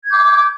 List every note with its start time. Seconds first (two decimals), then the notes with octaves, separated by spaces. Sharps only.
0.05 G#6
0.08 G6
0.12 D6